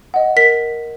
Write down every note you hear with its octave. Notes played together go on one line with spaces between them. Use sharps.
D#5 F#5
A#4 B6